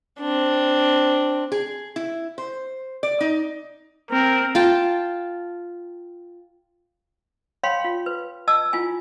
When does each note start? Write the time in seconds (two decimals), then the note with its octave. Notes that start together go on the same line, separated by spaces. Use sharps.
0.20 C4 D4
1.52 G#4
1.96 E4
2.38 C5
3.03 D5
3.21 D#4
4.11 C4 A#4
4.55 F4 G5 A5
7.63 C#5 F5 G5 B5 C6
7.84 F4
8.06 B4
8.48 D#5 A5 E6
8.73 E4 F4 G#5